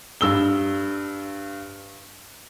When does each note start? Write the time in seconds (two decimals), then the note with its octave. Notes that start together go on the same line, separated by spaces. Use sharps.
0.21 G2 E6 G7